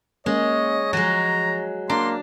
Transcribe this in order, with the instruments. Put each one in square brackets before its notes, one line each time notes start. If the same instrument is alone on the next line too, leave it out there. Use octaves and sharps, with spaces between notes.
[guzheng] G#3 [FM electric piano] A#3 C#4 [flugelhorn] C#5 [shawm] D#5
[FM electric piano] F3 [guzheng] F#3 G#3 [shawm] A#5
[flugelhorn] A#3 [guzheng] D4 [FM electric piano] A#5 [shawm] C6